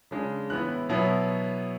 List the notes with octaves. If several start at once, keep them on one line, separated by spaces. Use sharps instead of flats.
C#3 G#3 D4
A2 E3 B3 E4 F#6
B2 F#3 B3 E4